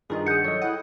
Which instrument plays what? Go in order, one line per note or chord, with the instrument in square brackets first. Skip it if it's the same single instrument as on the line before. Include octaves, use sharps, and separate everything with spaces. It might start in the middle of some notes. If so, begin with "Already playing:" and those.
[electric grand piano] G2 D#3 D#4 [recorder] F4 [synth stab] G#4 A#4 D#5
[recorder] G#4 [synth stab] F#5 D#6 [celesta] G6 C#7
[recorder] F#3 [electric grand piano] A4 D#5 [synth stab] C#5
[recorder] E4 [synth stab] F#5 G5 D#6